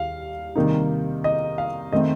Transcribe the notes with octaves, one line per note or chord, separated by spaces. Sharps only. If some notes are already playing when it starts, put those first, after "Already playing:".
Already playing: D#2 G3 F5
C3 D#3 G3 A#3 D#4
D#5
F5
D#3 A3 C4 D#5